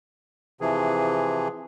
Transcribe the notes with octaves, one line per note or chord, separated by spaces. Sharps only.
C3 E3 F3 G#4